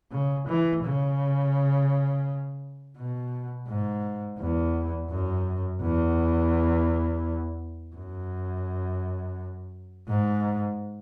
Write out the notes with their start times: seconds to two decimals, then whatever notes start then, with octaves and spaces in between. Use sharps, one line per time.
0.12 C#3
0.48 E3
0.84 C#3
2.97 B2
3.68 G#2
4.39 E2
5.11 F#2
5.82 E2
7.95 F#2
10.08 G#2